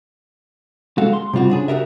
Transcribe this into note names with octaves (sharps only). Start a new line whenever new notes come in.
G#3 F#4 A4 F5
C6
C3 G3 F4 F#4
C#3 D4 G#4
F#4 G4 A#4 E5